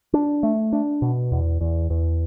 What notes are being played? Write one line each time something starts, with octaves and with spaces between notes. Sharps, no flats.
D4
A3
D4
B2
E2
E2
E2